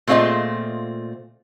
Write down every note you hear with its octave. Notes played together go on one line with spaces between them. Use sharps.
A#2 A3 C4 F4 G#4 D#5